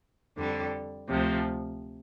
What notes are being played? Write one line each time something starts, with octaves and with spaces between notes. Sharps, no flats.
F2 D3 G3
D2 C3 F3